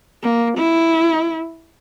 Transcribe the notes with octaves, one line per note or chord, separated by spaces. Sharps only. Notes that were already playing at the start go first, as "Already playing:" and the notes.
A#3
E4